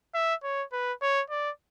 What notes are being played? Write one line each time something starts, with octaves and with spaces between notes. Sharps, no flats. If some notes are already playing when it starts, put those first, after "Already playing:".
E5
C#5
B4
C#5
D5